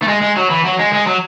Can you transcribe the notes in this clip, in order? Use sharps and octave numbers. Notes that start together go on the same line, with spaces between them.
A3
G#3
G#3
F#3
E3
F#3
G#3
G#3
F#3